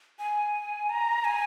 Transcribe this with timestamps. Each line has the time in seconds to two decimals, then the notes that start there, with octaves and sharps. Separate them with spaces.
0.19 G#5
0.89 A#5
1.25 G#5